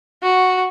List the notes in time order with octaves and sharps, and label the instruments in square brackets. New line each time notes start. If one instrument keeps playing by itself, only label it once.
[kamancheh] F#4